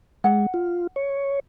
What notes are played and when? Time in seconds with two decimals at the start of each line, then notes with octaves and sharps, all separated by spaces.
0.24 G#3 F#5
0.54 F4
0.96 C#5